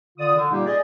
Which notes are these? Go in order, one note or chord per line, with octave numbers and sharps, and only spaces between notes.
D3 F4 D5 D#6
D3
A#2 G3 A#3 D#4 G4
G#4 D5 D#5